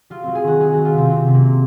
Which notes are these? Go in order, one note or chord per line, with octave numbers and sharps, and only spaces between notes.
F#3 F4
F#3 C4
G#4
D#3 F#4
F#3 G#4
F#3 F#4
F4
C3 C4
F#3 C4
C3
A#3
F#3